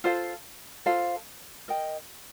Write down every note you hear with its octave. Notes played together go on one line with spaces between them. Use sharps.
F4 A4 C5 F5
F4 A4 C5 F5
A#4 D#5 G5